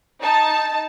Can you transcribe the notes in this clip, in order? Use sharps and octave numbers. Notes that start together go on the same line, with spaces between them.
D#4 A5